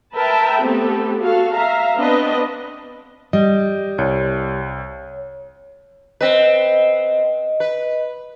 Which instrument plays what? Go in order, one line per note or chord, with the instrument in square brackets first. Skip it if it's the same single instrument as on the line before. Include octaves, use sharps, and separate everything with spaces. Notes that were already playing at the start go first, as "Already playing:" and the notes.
[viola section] A#4 B4 E5 G5 A5
A3 B3 C4 G4 A4
F#4 A4 F5
E5 F5 A#5
B3 C4 D4 B4 D#5
[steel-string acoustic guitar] G3 [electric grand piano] D#5
[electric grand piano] C2 [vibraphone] C#5
[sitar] C4 B4 [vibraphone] D#5
[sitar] B4